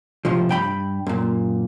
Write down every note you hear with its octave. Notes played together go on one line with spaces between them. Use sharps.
C#2 A2 C3 F3
G2 G5 B5
F#2 A#2